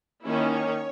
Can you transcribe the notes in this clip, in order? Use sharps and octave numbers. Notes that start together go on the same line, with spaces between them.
D#3 A#3 C#4 E4
C#5